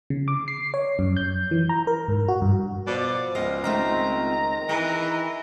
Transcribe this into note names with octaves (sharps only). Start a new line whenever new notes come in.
C#3
D6
C7
C#5
F#2
G6
E3
A#5
A#4
G#2
F#4
G2
B2 F3 D5
C#2 D#5 F5
D#3 A3 C4 F4 A#5
E3 G#4